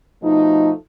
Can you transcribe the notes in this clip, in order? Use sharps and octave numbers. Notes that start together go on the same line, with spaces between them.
B2 F3 A3 D#4